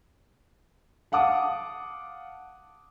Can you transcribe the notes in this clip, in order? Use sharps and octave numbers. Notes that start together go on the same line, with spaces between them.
F5 F#5 A5 D6 D#6